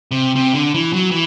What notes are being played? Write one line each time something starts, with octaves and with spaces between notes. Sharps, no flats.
C3
C3
D3
E3
F#3
E3